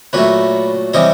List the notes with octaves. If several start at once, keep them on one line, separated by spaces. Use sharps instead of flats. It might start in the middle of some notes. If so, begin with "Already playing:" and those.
A#2 F#3 A3 B4 C#5
C3 E3 G3 C#5 D#5